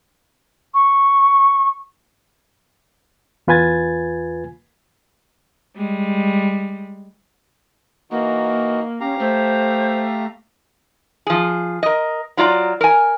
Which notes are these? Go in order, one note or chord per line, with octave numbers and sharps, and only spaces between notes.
C#6
E2 F4 B4 G#5 G#6 A6
G3 G#3
E3 A#3 D#4 F#4
C#4 G4 F5 A#5
A3 C5
F3 G#4
A#4 D#5
F#3 F4 D5 A#5
A#4 G#5